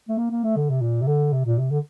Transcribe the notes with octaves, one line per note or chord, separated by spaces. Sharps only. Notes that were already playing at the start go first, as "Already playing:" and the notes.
A3
A#3
A#3
A3
D3
C3
A#2
C3
D3
C3
A#2
C3
D3